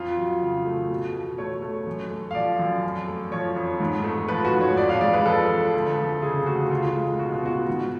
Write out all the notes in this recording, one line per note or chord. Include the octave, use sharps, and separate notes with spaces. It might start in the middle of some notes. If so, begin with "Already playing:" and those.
Already playing: F2 F4
F#3
C#3
A3
B2
B2
A3 C#5
A3
F#2
A3
F5
F3 D5
F#2
F2
A3
F3 C#5
F2
G#2
A3
F3 B4
F#4
G#2
C#5
F2 D5
F5
G#3 D5
B4
F3 A4
F2
D2
F3
C#3 G#4
A3 F#4
C#2 F4
G#3
B2 F#4
F4
B3 F#4
G#2